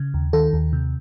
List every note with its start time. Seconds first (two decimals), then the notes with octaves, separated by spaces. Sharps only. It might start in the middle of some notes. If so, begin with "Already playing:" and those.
Already playing: C#3
0.14 D#2
0.33 D#3 A4
0.53 D#2
0.73 C3